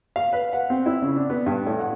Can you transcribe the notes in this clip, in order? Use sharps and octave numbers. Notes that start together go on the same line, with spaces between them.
F5
B4
F#5
C4
E4
C#3
D4
B3
G2
A2
F#5